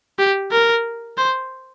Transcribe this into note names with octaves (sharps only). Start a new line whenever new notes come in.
G4
A#4
C5